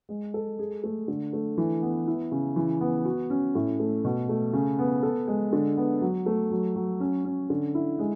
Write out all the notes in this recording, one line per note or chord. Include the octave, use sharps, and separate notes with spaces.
G#3
A4
G#4
A3
D3
A3
E3
B3
E4
C#3
E3
B3
F#4
C#4
A2
A3
B2
A3
C#3
B3
A4
G#3
D3
B3
F#3
A3
F#3
F#3
C#4
C#4
D3
E4
G#3